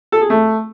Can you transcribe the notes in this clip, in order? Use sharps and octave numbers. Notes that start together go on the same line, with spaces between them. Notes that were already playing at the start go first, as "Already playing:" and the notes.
A4
G#4
A3